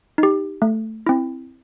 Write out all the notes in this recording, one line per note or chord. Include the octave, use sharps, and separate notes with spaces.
D#4
G4
A3
C4 E4